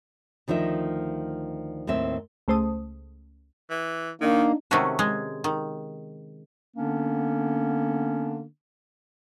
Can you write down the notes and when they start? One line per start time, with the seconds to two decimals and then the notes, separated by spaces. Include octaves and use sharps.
0.48 D2 D#3 F3 D#4 E5
1.87 D#2 A2 C4 E5
2.48 C#2 A3 C5 A5 D#6
3.70 E3
4.21 D#3 A#3 D4 D#4
4.71 C3 D#3 G#3 A3 C#4 F#4
4.99 G#3
5.44 D#3
6.77 D3 A#3 B3 C#4 D4